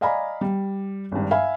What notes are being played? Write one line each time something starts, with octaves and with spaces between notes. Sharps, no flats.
D5 D#5 F5 G#5 A#5 B5
G3
G#1 G2
E5 F5 G#5 B5